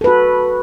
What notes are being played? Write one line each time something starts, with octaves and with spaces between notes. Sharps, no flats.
F#4 A4 B4